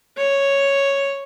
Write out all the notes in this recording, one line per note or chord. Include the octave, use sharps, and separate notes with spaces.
C#5